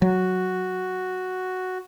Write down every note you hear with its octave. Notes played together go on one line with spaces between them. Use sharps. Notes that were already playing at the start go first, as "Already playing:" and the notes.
F#3 F#4